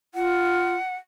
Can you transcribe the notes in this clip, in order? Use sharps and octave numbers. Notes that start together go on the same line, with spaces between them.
F4 F#5